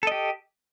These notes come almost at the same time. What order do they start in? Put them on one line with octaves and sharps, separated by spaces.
A4 D#5 G4